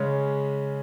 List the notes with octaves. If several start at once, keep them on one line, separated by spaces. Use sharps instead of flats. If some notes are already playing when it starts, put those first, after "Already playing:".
Already playing: C#3 G#3 C#4